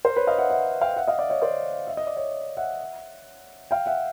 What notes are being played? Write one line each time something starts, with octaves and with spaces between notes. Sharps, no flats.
A#4 C5
B4 C#5
D#5 F5
E5 F#5
E5 F#5
F5 G5
E5 F#5
D#5 F5
D5 E5
C#5 D#5
C5 D5
E5
D#5
D5
C#5 D#5
E5 F#5
F5 G5
E5 F#5